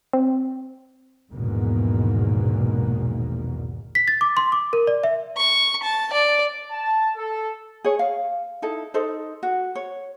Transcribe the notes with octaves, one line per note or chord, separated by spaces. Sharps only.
C4
A#1 E2 G#2 B2 D#3 A#3
B6
A6
D6
C6
D6
A#4
D5
E5
C#6
A5
D5
A5
A4
G#4 C#5
F5
D#4 E4 A4
D#4 A4 C5
F#4
C#5